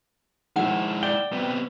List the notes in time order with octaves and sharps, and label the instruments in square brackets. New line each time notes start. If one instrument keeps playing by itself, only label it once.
[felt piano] D#3 F3 [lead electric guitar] G#3 E4 [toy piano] F#5
[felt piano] D5 [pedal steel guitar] G5
[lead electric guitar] C3 B3